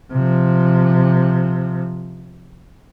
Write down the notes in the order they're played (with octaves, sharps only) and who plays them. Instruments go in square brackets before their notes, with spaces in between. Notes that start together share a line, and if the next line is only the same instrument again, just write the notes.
[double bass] C3 F3